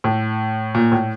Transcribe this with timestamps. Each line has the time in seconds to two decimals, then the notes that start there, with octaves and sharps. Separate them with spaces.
0.04 A2
0.75 A#2
0.92 A2